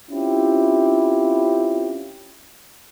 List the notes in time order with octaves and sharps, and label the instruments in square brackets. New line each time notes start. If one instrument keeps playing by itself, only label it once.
[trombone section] C4 C#4 E4 F4 G4